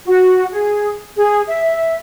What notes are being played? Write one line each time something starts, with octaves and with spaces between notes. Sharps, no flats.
F#4
G#4
G#4
E5